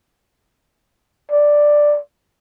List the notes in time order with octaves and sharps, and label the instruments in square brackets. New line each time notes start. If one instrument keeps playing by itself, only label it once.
[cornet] D5